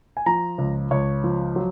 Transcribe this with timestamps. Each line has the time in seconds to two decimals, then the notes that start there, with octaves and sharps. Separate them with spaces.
0.17 G#5
0.26 F3 A#5
0.58 C#2
0.91 C#2 C#5
1.24 F3
1.56 F#3